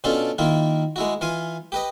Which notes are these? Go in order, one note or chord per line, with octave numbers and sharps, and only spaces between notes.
B2 C#4 D4 F4 A4
D#3 A#3 E4 F4
G#3 E4 F#4
E3 F4 F5 G#5
G4 B4 D#5